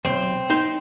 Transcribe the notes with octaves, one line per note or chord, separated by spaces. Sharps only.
B1 E2 C4
D#4 C5